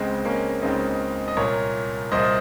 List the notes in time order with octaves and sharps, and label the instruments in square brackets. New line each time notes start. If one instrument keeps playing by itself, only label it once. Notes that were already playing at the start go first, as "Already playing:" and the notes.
Already playing: [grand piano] C#2 C#3 G#3 C4
A#3 C#4
C#2 C#3 C4 D#4
D#5
C2 A#2 A#4 C#5
C2 A#2 C5 D#5